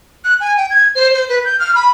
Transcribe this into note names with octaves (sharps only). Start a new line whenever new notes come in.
F#6
G#5
G5
G#6
C5
C5
B4
G6
F6
B5